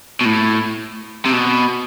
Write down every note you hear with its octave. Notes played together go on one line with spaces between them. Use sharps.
B2
A2
C3
B2